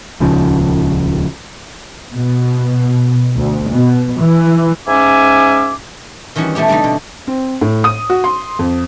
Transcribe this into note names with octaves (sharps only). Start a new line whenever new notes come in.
D#1 C#2 C#3 F3
B2
D2
B2
E3
G#2 C#4 E5 G#5 D6
D#3 E3 G3 C#4 E4 F#4
B2 A3 B3 E4 G4
D3 G3 A3 C4 D#4
B2
C4
A2
D#6
F#4
C6
F2